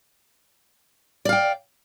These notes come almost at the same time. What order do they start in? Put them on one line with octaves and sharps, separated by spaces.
D5 F5 G5